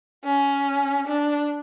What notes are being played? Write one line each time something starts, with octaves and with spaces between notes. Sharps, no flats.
C#4
D4